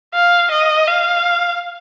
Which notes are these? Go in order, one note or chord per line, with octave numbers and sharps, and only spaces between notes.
F5
D#5
F5